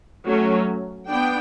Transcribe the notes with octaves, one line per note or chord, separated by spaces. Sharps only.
F#3 A3 C#4
B3 D4 G5